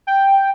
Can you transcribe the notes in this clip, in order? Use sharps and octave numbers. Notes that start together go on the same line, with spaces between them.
G5